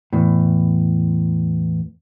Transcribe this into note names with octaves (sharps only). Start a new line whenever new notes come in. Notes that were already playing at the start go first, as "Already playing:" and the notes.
E2 A2